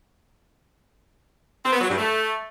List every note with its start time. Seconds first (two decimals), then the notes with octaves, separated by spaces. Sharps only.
1.64 C4
1.73 B3
1.81 F#3
1.89 G2
1.98 A3